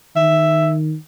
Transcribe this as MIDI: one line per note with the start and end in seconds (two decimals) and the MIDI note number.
0.16 0.95 51
0.16 0.73 76